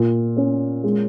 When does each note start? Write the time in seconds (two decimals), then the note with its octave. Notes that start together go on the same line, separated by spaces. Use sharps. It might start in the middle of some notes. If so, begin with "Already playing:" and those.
Already playing: A#2
0.37 C#4
0.84 G#3